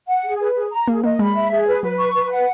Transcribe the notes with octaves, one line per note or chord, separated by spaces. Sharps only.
F#5
G#4
B4
G#4
A#5
A#3 G#4
A#3 D#5
G#3 B5
E5
G#4
B4
F#3 B4
C#6
B4
F#5